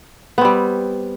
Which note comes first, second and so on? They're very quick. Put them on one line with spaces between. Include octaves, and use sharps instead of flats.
B3 C4 G3